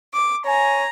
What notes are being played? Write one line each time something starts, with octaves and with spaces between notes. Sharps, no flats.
D6
C#5 G#5 A#5